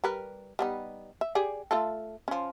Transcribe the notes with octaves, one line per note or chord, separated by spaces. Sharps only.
G3 A#4 B4
G3 B3 D#4
E5
G4 G#4 D5
A3 F4 A4
F3 C#4